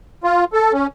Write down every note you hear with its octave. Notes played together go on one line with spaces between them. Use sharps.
F4
A4
C#4